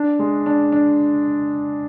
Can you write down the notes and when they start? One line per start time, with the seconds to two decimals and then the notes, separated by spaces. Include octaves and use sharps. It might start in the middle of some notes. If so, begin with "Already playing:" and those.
Already playing: D4
0.19 G#3
0.46 D4
0.72 D4